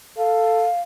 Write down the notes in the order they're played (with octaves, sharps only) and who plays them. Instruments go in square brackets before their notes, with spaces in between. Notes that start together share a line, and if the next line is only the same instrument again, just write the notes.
[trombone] A4 [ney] F5